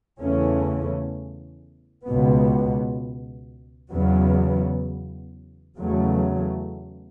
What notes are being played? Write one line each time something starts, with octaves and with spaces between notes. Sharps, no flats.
E2 C#3 E3 A3 C#4
C#2 B2 B3
E2 C#3 F#3 B3
E2 C#3 F#3 A3